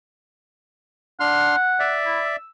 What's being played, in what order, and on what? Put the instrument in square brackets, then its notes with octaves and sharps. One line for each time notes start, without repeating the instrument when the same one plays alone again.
[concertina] D4 C6 F6 [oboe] F#5
[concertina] D5 E5
[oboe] E4
E6